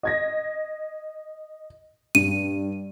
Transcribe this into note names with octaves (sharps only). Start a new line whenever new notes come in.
D#5 G#6 A#6
G2 D#7